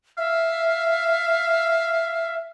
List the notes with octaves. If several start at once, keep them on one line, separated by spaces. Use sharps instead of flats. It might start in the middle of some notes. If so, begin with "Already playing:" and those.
E5 F5